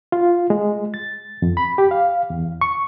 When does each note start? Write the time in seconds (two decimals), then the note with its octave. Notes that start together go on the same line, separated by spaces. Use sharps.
0.12 F4
0.50 G#3
0.94 A6
1.42 F2
1.57 B5
1.78 G4
1.91 F5
2.30 E2
2.61 C#6